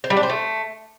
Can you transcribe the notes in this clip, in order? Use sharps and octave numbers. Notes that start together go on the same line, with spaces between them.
C5
G3
D4
C5
A3